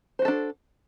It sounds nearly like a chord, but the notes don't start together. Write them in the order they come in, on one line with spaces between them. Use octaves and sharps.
C5 F#4 A4 D4